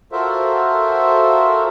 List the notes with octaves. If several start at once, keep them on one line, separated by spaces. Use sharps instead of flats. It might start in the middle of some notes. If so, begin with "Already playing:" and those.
F4 F#4 A4 A#4 C5 E5